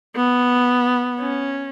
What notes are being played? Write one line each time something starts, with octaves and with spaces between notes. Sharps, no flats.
B3
C#4